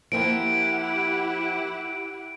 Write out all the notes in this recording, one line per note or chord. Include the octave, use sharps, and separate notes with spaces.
F3 A#3 C4 E4 G4 F#5 D7